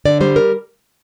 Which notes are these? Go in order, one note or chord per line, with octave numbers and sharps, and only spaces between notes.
D3 D5
G3 C5
A#4